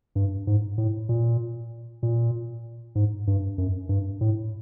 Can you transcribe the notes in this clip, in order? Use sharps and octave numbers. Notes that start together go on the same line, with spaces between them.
G2
G#2
A2
A#2
A#2
G#2
G2
F#2
G2
A2